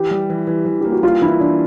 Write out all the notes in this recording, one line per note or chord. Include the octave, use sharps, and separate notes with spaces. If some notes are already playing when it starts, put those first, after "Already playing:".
Already playing: E3 G4
G3
E3
E3
E3
A#3 G4
F#4
G3 F4
E3 E4
E3 D4